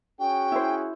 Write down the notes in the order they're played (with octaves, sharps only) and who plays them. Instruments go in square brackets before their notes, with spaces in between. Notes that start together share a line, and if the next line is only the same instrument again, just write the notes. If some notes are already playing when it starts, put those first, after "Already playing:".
[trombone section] C#4 F#4 G#4 [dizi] G5
[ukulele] E4 C5